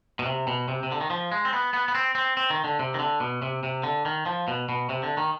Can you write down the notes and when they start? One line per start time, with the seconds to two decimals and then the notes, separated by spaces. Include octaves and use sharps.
0.19 B2
0.26 C3
0.47 B2
0.68 C3
0.83 C3
0.92 D3
1.01 D#3
1.10 F3
1.32 G#3
1.45 C4
1.53 B3
1.74 B3
1.88 B3
1.95 C4
2.15 C4
2.37 C4
2.50 D#3
2.64 D3
2.79 C3
2.94 D#3
2.99 D3
3.20 B2
3.42 C3
3.63 C3
3.83 D3
4.05 D#3
4.26 F3
4.48 B2
4.69 B2
4.89 C3
5.03 D3
5.17 D#3